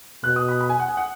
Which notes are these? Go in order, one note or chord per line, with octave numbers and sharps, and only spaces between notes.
B2 F#6
D#6
B5
B5
G#5
F#5
G#5
F#5